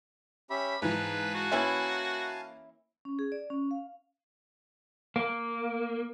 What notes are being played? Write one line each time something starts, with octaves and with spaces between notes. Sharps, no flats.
C#4 G4 E5 B5
G#2 E3 B4 F5 G#5 A5
F#4
E3 A#3 C#4 E4
C#4
G#4
D5
C#4
F5
A#3